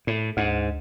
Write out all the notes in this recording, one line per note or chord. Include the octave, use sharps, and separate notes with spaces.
A2
D2 G#2